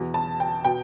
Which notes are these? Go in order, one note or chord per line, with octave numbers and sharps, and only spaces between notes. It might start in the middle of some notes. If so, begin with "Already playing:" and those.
Already playing: E2 B2
A5
G5
B2 G5